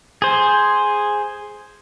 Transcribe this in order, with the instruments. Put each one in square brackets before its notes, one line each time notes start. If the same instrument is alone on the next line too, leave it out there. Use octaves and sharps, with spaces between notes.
[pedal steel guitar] G#4 C5